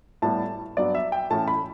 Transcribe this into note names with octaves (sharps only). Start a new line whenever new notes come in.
A2 G3 B3 A5
G2 F#3 B3 D5
E5
G5
A2 E3 A3 C#4 A5
B5